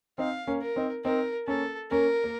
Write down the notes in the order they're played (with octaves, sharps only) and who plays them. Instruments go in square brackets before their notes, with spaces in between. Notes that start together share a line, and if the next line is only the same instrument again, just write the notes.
[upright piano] C4 D#4 [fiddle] F5
[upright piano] A#3 C#4
[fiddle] A#4
[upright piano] C4 D#4
[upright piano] C4 D#4 [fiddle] A#4
[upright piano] A#3 C#4 [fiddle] A4
[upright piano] A#3 C#4 [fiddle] A#4
[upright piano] A#3